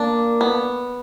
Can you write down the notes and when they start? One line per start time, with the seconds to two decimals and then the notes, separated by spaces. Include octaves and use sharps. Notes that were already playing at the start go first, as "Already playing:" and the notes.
Already playing: A#3 D4
0.41 B3